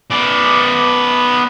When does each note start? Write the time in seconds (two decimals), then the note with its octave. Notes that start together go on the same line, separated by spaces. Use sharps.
0.11 B3 D5